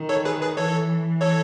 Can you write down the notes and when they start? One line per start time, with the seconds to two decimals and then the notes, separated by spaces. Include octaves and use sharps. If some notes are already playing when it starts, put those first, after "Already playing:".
Already playing: D#3
0.09 A4 C#5
0.25 G#4 B4
0.41 G#4 B4
0.57 E3 A4 C#5
1.21 A4 C#5